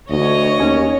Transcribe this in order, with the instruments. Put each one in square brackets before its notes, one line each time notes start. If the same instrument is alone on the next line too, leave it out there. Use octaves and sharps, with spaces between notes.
[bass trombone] D2 [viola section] C#5 [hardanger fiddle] D#5
[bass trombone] D#2 [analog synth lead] C#4